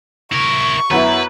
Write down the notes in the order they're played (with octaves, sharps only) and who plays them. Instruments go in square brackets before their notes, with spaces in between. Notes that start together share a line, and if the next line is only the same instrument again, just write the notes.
[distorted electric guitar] E4 A#4 [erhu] C#6
[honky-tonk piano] F#2 B3 E4 [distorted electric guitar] B4